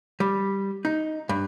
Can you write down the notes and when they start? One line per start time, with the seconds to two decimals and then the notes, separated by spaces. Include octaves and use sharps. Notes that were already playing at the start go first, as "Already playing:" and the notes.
0.20 G3
0.85 D#4
1.29 G2